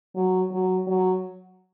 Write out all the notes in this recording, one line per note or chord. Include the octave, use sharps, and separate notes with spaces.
F#3
F#3
F#3